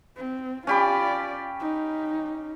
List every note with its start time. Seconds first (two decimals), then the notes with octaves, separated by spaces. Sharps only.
0.17 C4
0.67 C#4 F4 G4 D5 B5
1.60 D#4